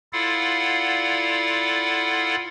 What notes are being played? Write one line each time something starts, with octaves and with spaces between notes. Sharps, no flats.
E4 F4 A4 D5 F5 F#5